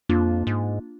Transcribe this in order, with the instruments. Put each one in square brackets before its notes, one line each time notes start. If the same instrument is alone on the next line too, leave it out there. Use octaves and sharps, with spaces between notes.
[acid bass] F2 [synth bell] A#3 D4 F4
[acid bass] G#2